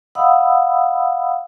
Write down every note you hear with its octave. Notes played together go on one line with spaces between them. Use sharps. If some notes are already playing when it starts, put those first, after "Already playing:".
D#5 F5 F#5 B5 D#6 E6